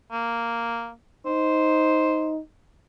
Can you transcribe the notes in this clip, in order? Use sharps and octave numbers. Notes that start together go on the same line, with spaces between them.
A#3
D#4 C5